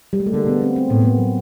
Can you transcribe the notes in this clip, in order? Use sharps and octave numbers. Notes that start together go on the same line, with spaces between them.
G3
G#3
A3
D3 A#3
B3
C4
C4
A2 B3
B3
A#3
F#3